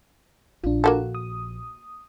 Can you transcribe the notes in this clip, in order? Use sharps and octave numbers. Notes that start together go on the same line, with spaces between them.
A#1 D4 F4
A#3 F#4 A4
D#6